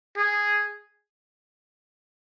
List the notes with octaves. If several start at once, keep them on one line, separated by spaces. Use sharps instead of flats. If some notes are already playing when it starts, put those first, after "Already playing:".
G#4